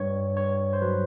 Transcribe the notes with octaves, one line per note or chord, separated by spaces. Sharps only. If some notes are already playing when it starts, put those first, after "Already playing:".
Already playing: G2 C#5
G2 C#5
C5
F#3 B4